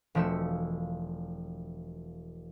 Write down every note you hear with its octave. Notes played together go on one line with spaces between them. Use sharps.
E1 F3 A3 E6 C#7